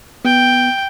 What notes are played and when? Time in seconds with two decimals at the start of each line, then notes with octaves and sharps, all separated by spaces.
0.25 B3 G5